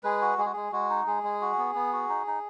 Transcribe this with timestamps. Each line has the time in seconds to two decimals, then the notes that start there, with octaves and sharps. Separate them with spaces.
0.04 G#3 G#4 B4
0.21 F#4
0.38 G#3 G#4
0.45 F#4
0.53 G#3 G#4
0.72 G#3 F#4
0.90 D#4
1.07 G#3 G#4
1.24 G#3
1.41 F#4
1.58 B3
1.75 B3
1.93 F#4
2.09 D#4
2.27 D#4